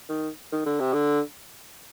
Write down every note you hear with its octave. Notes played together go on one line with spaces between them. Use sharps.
D#3
D#3
D3
C3
D3